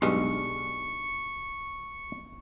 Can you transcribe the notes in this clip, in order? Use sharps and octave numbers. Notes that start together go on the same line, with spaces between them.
B1 G2 G#3 C#6